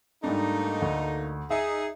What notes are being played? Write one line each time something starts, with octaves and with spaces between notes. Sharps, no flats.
G#2 G3 A3 A#3 D4 D#4
D2
D#4 G#4 E5